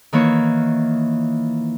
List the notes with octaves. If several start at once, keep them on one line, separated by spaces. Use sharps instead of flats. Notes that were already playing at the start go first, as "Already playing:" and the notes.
D#3 E3 A#3 C#5